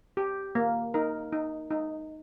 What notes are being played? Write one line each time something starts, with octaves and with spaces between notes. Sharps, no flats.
G4
A#3
D#4 A#4
D#4
D#4